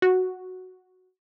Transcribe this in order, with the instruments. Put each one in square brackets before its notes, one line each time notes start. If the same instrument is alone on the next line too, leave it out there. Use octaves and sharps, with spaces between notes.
[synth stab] F#4